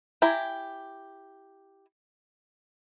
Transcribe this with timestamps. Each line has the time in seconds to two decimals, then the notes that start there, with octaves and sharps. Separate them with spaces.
0.22 E4 G4 G#5 A#5